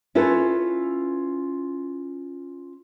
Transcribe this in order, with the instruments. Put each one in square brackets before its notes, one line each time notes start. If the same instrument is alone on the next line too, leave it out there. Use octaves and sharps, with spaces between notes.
[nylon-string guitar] C#4 E4 F4 A4 B4